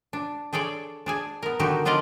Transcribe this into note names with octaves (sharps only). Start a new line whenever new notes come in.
D4
D4 G#4 A4 C#5 D5
D4 G#4 G#5
B3 A#4
D3 D#3 F#3 D#4 F#4 G4
B3 D4 F4 D5 D#5 F5